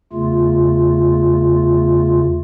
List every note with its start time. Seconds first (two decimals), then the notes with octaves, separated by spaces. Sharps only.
0.13 E2 C#3 A3 F4